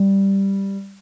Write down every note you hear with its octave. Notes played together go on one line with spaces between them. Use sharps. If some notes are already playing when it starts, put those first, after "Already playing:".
Already playing: G3